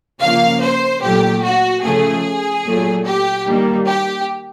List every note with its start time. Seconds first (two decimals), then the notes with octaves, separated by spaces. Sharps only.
0.21 C#3 F3 A#3 F5
0.61 C5
1.02 A#2 F#3 A3 G4
1.43 F#4
1.83 C#3 F3 A3 G#4
2.65 A#2 F#3 A3
3.05 G4
3.46 D#3 G3 A#3
3.86 G4